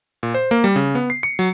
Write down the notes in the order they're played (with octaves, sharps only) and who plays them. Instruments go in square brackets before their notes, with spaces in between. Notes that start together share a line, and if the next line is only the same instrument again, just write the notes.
[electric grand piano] A#2
C5
A#3
G3
C#3
B3
C7
C#7
F#3